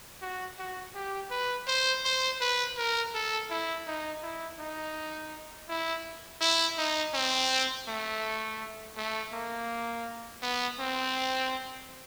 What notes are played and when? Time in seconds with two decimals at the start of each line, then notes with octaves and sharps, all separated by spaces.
0.22 F#4
0.58 F#4
0.95 G4
1.31 B4
1.67 C5
2.05 C5
2.41 B4
2.77 A#4
3.14 A4
3.50 E4
3.87 D#4
4.23 E4
4.59 D#4
5.69 E4
6.41 E4
6.78 D#4
7.14 C4
7.88 A3
8.97 A3
9.33 A#3
10.42 B3
10.79 C4